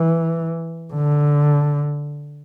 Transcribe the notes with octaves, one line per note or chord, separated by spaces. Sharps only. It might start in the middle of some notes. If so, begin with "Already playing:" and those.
Already playing: E3
D3